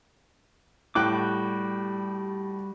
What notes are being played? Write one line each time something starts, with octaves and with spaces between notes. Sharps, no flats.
A2 G3 F#4 G5 D6 F#6